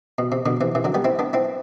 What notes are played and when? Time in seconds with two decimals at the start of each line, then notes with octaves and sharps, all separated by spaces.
0.18 B2
0.32 C3
0.46 B2 D3
0.61 C3 E3
0.75 C3 E3
0.84 D3 F#3
0.94 G3 B3
1.04 C4 E4
1.19 B3 D4
1.33 C4 E4